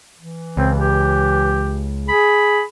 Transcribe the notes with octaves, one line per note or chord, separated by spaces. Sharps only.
E3
C#2 C4
G4
G#4 B5